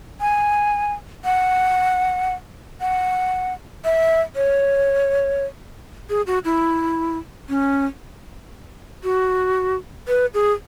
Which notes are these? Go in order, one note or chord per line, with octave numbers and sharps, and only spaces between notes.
G#5
F#5
F#5
E5
C#5
G#4
F#4
E4
C#4
F#4
B4
G#4